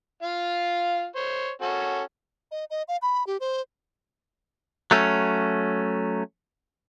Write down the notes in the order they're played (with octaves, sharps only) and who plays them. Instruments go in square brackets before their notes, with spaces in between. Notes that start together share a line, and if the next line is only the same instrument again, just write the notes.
[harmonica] F4 F5
C5 C#5
C#4 F#4 A4
[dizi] D#5
D#5
F5
B5
G4
C5
[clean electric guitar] F#3 A3 C#4